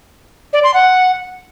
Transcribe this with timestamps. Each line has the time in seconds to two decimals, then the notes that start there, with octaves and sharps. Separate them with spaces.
0.53 D5
0.64 C6
0.74 F#5